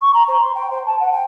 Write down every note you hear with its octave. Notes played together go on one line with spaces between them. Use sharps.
C#6
A#5
C5
C6
G5
C5
A5
F#5
G5